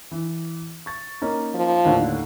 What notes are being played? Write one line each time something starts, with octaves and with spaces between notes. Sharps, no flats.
E3
C#6 A6
A#3 C#4 D#4
F3
D#2 A2 D3